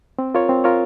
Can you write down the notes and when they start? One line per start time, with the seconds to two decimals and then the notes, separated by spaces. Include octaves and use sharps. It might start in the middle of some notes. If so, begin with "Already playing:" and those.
0.19 C4
0.34 F4 A#4 C#5
0.49 C4
0.64 F4 A#4 C#5